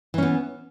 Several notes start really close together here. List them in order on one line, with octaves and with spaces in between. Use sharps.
E3 C#4 B3